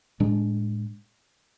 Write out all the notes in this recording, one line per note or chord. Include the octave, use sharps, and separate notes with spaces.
A2 G#3 D4